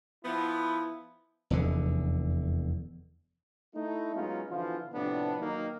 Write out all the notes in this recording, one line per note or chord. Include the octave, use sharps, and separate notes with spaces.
F3 B3 E4
F1 E2 D3
A3 D#4 E4
F#3 G#3 B3 C#4 D#4 F4
B2 D3 E3 F3 F4
A2 C3 F3 B3 D4
B1 D#3 F#3 A#3 D#4